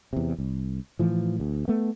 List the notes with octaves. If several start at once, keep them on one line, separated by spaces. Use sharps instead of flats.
E2 C3
C2
A2 E3 F3
D2
A3 B3